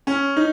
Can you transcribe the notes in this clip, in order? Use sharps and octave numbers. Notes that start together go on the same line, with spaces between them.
C#4
D#4